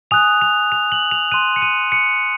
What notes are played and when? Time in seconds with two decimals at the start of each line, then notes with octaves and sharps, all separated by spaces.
0.11 G#5 D#6 F#6 F7
0.41 F7
0.72 F7
0.92 F#7
1.11 F7
1.32 C6 F#6 D#7
1.56 C#7
1.62 D#7
1.92 C#7